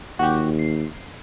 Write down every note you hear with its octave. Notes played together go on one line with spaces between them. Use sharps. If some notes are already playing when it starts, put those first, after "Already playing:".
D#2 F#4 G4
C7